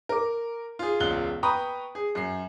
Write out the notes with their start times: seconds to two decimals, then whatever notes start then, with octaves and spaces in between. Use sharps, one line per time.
0.09 A#4 D6
0.79 F4 G#4
1.00 E1 C#2 F4 F#6 G7
1.43 B4 G5 A#5 B5 C#6 D#6
1.95 G#4
2.15 F#2 C7